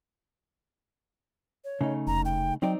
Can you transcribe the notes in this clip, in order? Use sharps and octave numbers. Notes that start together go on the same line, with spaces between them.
C#5
C#3 A3 D#4
F1 A#5
G5
F#3 C4 D#4 D5 G5